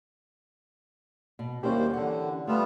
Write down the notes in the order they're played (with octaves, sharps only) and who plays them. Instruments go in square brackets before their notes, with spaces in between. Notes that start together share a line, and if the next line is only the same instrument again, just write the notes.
[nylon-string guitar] B2
[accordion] D#2 C5 [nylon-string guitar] G3 A#3 E4 [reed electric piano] C#4 G4
[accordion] D3 [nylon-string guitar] E3 F#5
[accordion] G3 B3 F4 [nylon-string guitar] A3 E5